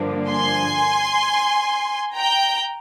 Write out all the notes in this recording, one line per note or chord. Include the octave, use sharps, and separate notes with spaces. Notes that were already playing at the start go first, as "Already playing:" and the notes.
Already playing: G2 D3 F3 A#3 D4
G#5 C6
G5 A#5